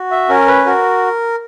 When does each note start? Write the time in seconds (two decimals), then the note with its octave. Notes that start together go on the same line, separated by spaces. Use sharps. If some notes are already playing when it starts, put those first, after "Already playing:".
Already playing: F#4
0.11 E5
0.29 C#4 A#4
0.48 B4
0.66 F#4 A#4